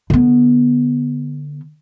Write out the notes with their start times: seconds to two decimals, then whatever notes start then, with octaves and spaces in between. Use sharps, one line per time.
0.10 D3 B3